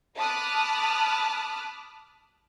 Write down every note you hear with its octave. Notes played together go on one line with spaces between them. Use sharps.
A5 B5 D6 D#6 F6 F#6